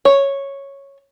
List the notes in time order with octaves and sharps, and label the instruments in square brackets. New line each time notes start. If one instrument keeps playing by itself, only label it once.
[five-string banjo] C#5